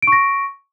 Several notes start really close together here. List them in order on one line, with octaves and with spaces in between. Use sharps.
D7 C#6 A#6